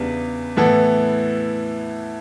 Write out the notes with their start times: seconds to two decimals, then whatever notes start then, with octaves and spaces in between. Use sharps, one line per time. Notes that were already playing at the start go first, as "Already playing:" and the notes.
Already playing: E2 C#3 G3 B3 D4
0.57 A2 E3 B3 E4 A4